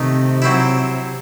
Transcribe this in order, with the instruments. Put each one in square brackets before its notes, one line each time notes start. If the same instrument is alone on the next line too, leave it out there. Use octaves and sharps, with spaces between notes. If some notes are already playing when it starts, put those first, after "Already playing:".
Already playing: [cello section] C3 [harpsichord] D#3 A3 D#4
[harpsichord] F#3 C4 E4